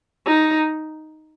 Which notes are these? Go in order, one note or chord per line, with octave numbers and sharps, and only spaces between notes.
D#4